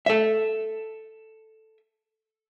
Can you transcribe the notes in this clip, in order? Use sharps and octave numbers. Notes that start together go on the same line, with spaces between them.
A4 E5